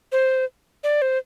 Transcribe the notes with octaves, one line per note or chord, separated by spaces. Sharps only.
C5
D5
C5